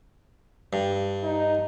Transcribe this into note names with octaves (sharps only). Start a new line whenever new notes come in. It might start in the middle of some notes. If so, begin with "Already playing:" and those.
G2
D#4